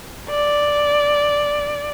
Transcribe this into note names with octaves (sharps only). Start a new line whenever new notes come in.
D5